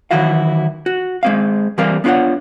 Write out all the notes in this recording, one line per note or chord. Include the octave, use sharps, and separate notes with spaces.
D#3 E3 F#3 E4 F#4 F5
F#4
G#3 C4 F5
E3 G3 C4 G4 A#4 F5
B3 D4 F4 B4 C#5 F#5